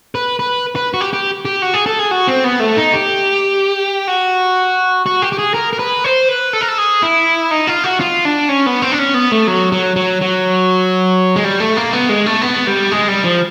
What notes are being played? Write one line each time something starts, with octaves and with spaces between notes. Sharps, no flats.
B4
B4
B4
F#4
G4
G4
G4
F#4
G#4
A4
G#4
F#4
C4
B3
A3
D#4
G4
F#4
F#4
G4
G4
G#4
A#4
A#4
B4
C5
B4
A4
A#4
A4
G#4
E4
D#4
F4
F#4
F4
D4
C#4
B3
C4
D4
C#4
B3
A3
F#3
F#3
F#3
F#3
G#3
G3
A3
A#3
B3
G#3
A3
B3
G3
G#3
G3
F3